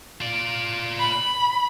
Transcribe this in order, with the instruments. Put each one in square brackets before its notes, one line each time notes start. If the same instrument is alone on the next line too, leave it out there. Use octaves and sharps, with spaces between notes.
[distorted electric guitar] F4 D5
[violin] B5